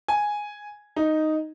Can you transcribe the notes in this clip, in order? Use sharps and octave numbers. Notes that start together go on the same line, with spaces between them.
G#5
D#4